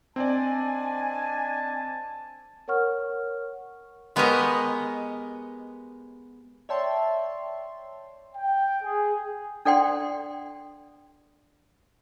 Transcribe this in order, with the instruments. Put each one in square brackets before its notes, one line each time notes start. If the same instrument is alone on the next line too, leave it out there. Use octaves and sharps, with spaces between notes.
[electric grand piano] C4 D5 [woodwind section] D4 D#5 G#5 [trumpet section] A5
[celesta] A#4 C#5 F#5 C#6 F6
[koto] G#3 B3 G4 A#4 C#5 D#5
[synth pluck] C#5 D5 E5 G5 A5 C6
[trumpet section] G5
G#4
[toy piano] D4 A4 D5 F#5 G5 C6